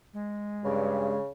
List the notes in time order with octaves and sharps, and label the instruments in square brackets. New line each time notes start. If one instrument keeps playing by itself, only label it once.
[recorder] G#3
[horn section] G2 [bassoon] C#3